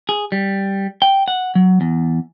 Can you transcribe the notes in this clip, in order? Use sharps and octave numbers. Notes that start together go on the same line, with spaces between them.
G#4
G3
G5
F#5
F#3
E2